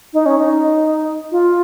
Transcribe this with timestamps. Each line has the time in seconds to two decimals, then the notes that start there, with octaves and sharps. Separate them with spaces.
0.13 D#4
0.26 C#4
0.38 D#4
1.32 F4